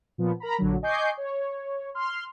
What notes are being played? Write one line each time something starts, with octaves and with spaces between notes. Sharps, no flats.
A#2 F3 B3
A#4 A#5 B5
A#1 D3 F#3
D#5 G#5 C#6 D6 G6 C7
C#5
C6 F6